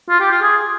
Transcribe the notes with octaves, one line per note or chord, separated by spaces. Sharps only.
F4
G4
F4
G#4